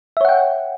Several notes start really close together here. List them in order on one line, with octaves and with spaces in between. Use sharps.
E5 C#5 F#5 G5